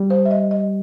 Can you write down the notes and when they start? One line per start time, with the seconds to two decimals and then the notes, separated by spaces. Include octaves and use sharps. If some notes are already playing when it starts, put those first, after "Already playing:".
Already playing: G3
0.10 C5
0.25 E5
0.31 D#5
0.51 D#5